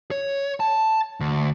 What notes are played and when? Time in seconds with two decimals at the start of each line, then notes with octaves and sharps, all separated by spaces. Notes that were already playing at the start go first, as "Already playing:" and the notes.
0.11 C#5
0.60 A5
1.20 D2